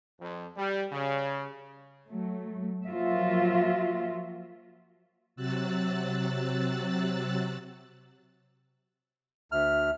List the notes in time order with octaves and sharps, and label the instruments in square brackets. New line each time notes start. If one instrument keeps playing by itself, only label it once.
[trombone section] F2
G3
C#3
[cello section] F#3 A3
F3 F#3 A#3 F4 F#4 E5
[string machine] C3 F#3 E6 F#6 A6
[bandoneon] D2 F6 [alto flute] E5